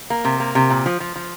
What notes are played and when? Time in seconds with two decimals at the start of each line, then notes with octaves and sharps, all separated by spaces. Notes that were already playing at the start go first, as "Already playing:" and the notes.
0.10 A#3
0.25 C3
0.40 A#3
0.55 C3
0.70 A#2
0.86 F3
1.00 F3
1.16 F3